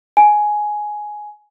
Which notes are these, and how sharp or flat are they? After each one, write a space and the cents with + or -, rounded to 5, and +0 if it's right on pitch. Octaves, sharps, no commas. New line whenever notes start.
G#5 +10